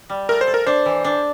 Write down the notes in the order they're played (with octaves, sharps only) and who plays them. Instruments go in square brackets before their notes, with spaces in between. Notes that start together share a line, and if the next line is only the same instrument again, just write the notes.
[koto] G3
[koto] A3 [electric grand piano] A#4
[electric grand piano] C5
[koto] A4
[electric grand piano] A#4
[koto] D4 [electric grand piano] C5
[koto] E3
D4